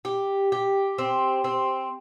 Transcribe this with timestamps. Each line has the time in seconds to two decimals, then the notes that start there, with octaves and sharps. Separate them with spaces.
0.05 G4
0.52 G4
0.98 C4
1.44 C4